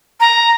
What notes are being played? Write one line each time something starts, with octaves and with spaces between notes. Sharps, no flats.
A#5